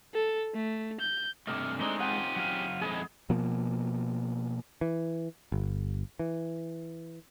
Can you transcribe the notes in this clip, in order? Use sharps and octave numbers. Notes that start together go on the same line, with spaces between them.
A4
A3
G6
G2 C3 A3 D#5 D6 F6
G#3 A3 C4 D4 D#4 G7
C4 C#4 F4 G4 F#5 D#7
F#3 F5
F2 G#3 E4 G#4 D#5
B2 F3 A#3
E3
G1
E3